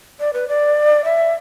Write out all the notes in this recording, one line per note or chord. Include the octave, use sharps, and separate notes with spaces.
D5
B4
D5
E5